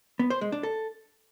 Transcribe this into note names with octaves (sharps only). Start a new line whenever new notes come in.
B3
C5
G#3
D4
A4